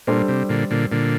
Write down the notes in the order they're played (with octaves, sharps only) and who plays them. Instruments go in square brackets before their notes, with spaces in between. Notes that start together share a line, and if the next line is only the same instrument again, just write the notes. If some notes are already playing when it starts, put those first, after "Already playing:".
[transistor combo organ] A#2 [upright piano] G3 D4 A4 C5
[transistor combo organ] C3
A#2 D3
A#2 D3
A#2 D3